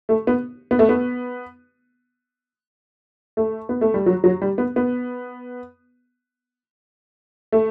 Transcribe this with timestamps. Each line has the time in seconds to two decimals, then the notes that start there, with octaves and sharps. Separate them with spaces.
0.09 A3
0.27 B3
0.71 B3
0.79 A3
0.89 B3
3.37 A3
3.69 B3
3.81 A3
3.94 G3
4.06 F#3
4.24 F#3
4.42 G3
4.58 B3
4.76 B3
7.52 A3